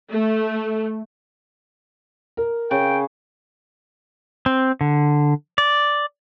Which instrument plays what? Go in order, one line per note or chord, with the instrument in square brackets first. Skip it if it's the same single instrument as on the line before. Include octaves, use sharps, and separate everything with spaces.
[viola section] A3
[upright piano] A#4
[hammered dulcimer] C#3 [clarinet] G5
[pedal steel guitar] C4
D3
D5